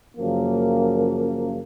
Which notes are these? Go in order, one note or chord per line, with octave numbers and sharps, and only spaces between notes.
F#2 C#3 F3 A#3